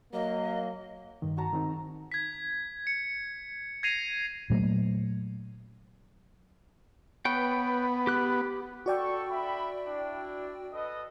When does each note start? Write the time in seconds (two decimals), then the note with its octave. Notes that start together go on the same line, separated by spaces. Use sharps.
0.13 F#3 A#3 D#5
1.22 G2 D#3
1.37 F#4 A5 A#5
1.53 D#3 C4 D#4
2.12 G#6 B6
2.87 C#7
3.83 G#6 A#6 C7 D#7 F7
4.50 A#2 F#3 A3 A#3
7.25 B3 B4 C#5 G5
8.07 G4 F#6
8.86 F#4 A4 D5 G5 C#6
9.30 D4 E5 B5
9.85 D4 E4
10.72 A4 B4 D#5